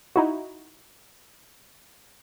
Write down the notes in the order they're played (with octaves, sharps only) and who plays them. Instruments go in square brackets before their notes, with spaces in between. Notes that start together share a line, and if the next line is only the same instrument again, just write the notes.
[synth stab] D#4 E4 F#4